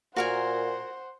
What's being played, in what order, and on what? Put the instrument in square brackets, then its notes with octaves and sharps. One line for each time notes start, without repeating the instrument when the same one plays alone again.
[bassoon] A#2 [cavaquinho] F#4 A#4 G#5 [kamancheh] C5 F#5